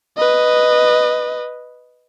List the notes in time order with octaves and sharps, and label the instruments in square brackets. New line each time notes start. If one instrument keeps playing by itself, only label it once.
[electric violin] B4 D#5